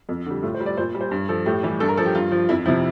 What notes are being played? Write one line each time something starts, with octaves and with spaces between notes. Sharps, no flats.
F2
D3 G3
A2 F4
C5
G3
D5
A#2 C5
G3
C5
G2
F3 A4
A2 G4
E3 G3
G2 A4
A#4
F3 A4
G4
G2 F4
F3
F2 E4
C3 F3 E4